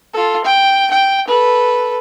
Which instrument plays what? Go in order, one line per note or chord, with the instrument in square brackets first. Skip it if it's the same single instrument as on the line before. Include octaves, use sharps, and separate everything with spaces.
[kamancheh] F4 A4
G5
G5
A4 B4